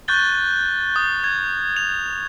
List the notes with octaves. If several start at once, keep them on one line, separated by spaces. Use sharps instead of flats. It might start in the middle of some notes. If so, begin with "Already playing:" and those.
C#6 F#6 G6 A6 G7
D#6
G#6
F7